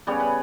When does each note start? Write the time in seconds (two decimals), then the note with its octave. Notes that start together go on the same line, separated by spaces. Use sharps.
0.07 C#3 G3 B3 C#5
0.20 B4